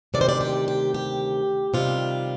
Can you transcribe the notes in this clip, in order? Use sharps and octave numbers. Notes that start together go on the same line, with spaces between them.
D2 C3 D#3 D5
C5
D5
G4
G4
G4
C3 D#3 G3 F4